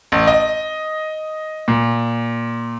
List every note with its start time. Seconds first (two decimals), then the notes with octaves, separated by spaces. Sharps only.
0.12 A1
0.27 D#5
1.68 A#2